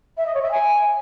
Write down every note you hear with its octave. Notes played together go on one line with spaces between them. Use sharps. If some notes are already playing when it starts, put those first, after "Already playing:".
E5
D#5
C#5
E5
G#5